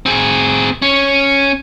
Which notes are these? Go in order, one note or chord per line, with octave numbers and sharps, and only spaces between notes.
C4 G#4
C#4